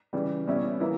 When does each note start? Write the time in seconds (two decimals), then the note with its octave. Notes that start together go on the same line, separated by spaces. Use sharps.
0.13 C#3 E3 G3
0.47 B2 G3 C#4 E4
0.80 E3 A#3 E4